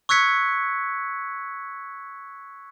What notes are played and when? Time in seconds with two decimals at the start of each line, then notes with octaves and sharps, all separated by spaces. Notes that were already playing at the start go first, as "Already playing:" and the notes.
0.09 C#6 E6 F#6 G#6 B6 C#7